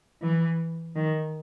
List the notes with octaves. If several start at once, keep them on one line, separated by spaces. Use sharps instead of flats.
E3
D#3